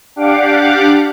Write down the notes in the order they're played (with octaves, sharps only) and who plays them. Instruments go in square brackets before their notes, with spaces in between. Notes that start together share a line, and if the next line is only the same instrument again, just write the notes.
[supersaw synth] D4 G4 F5 F#5 D6